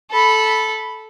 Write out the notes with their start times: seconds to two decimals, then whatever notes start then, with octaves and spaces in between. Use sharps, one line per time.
0.11 A4 B5